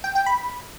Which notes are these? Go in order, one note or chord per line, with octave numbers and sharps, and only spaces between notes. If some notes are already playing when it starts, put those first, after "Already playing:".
G5
G5
B5